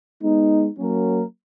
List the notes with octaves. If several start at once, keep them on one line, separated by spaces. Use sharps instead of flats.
G#3 B3 D#4
F#3 A#3 C#4 F#4 A#4